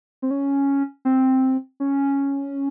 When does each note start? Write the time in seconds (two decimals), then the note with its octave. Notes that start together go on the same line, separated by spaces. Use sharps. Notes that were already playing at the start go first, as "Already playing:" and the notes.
0.22 C4
0.31 C#4
1.05 C4
1.80 C#4